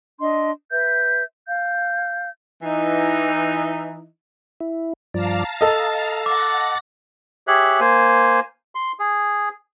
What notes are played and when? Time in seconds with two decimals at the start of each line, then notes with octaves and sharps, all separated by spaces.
0.20 D4 D#5 C6
0.70 B4 E5 G6
1.47 F5 G6
2.63 E3 D#4
4.60 E4
5.14 G2 F3 D5 F5 A5 A#5
5.61 A4 D#5 A6
6.26 F#5 D6 A#6
7.47 G4 G#4 C#5 E5 F#6
7.80 A#3 C5 G#5
8.75 C6
8.99 G#4